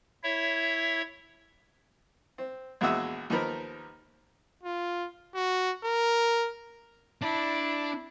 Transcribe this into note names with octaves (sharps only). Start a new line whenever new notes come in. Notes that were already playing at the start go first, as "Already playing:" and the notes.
E4 C#5 E5
C4
A#1 E2 G#3 F#4 E5 D#6
D#2 F3 B3 D#4 A#4 B5
F4
F#4
A#4
D4 E4